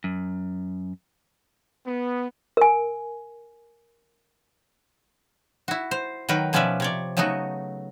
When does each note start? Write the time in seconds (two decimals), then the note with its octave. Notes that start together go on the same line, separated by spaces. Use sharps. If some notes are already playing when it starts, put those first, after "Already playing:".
0.04 F#2
1.86 B3
2.57 A#4 G#5
5.68 E4 F#4
5.91 C5
6.29 D#3 F#3 A#4 B4 G5
6.53 B2 F3 C#4 B4 D5 E5
6.80 C3 C#5 D5
7.17 C#3 F#3 A3 B3 D#4 F#4